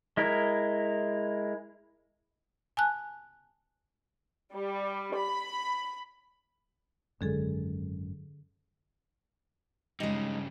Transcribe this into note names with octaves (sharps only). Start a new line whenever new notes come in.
G#3 E4 A#4
G#5 A5 F#6
G3
B5
G#1 F#2 D3 G#3 G#4 A4
G2 C#3 G#3 D#4